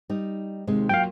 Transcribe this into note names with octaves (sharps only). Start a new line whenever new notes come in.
G3 D#4
D#2 C3 G#3
F#3 A#3 F4 F5 G5